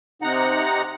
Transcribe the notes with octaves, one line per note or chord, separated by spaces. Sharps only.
C3 D#4 F#5 A#5